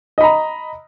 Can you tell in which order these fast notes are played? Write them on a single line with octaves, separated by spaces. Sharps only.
D#5 B5 A#5